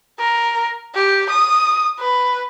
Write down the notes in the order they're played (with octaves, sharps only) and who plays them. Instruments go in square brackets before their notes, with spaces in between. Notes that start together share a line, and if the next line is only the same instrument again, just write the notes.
[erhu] A#4
G4
D#6
B4